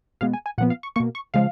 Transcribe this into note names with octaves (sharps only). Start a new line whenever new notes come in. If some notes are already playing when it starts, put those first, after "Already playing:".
B2 G#3 B3 F5
G#5
G#5
A#2 F3 B3 F#5
F5
C#6
B2 A#3 C#6
C#6
C#3 F3 G#3 F5